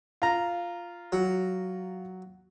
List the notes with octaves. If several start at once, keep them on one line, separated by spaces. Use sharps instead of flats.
F4 A#5
F#3